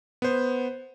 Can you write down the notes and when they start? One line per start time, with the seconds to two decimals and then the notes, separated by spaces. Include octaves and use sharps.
0.22 B3 C5